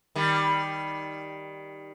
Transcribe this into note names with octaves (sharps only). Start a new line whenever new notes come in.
D#3 G3